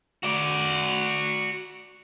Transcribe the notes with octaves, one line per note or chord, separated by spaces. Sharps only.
F#4 D5